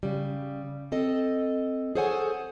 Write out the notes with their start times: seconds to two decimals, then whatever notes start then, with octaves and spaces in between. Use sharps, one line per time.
0.03 C#3 G3
0.92 C4 A4 D#5
1.95 G#4 A4 C5 C#5 F#5 G#5